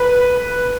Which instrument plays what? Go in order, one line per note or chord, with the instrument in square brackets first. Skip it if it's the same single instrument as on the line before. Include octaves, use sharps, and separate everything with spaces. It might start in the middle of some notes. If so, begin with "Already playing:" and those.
Already playing: [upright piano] B4